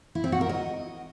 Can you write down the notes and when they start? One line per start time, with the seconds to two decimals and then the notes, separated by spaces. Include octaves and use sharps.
0.15 E4
0.24 C4
0.32 F#4
0.41 A#4
0.49 D#5